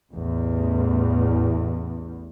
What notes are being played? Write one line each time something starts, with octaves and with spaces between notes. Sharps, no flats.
A1 E2